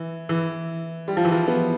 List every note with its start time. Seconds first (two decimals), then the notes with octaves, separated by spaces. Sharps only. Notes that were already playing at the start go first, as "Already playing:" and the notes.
Already playing: E3
0.29 E3
1.08 G3
1.17 F3
1.25 E3
1.32 F3
1.48 B3